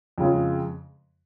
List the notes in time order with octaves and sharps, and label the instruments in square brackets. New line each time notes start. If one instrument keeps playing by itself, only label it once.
[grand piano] F2 C#3 G#3